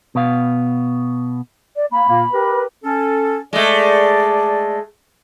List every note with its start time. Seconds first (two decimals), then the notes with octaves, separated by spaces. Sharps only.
0.15 B2 B3 F5
1.76 D5
1.92 A#3 B5
2.07 A#2 A#3
2.33 G4 A#4 B4
2.84 C#4 A4
3.53 G#3 A3 D5